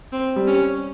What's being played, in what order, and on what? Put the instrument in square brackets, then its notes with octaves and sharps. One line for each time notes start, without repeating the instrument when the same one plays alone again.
[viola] C4
[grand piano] G3
[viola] C#4